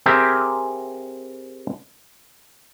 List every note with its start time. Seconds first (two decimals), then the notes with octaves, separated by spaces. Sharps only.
0.06 C4 G4 G#4 A#4 E5 G5